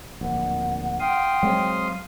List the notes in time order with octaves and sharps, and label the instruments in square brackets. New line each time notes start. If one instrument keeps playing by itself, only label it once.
[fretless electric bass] D1 A#1 [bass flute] F#5
[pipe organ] F5 C6 D#6 [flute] G5
[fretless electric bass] F#3 G#3 C4